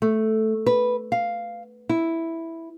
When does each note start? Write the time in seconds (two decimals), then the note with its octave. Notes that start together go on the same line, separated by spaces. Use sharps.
0.02 A3
0.67 B4
1.12 F5
1.89 E4